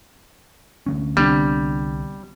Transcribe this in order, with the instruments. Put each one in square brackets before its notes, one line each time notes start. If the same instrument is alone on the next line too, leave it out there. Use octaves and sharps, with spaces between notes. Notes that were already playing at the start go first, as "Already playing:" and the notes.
[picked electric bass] D2 G3 C#4
[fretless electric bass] C2 D3 D4 [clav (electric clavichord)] G3 [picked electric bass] B3 C4